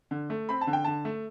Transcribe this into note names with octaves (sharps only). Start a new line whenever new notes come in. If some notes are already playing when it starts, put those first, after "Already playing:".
D3
A3
C4 B5
A5
D3
G5
D3 A5
A3